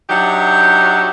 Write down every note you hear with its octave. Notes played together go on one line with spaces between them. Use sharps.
F#3 D4 D#4 G4 E5 F#5